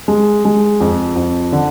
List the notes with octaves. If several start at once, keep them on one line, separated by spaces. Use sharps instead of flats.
G#3
G#3
F2
F2
D3